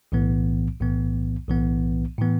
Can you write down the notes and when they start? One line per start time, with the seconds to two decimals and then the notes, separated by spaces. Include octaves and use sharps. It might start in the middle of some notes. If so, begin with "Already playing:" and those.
0.12 B1 A2 E3 B3
0.80 B1 A2 E3 B3
1.49 B1 A2 E3 B3
2.19 A2 E3 B3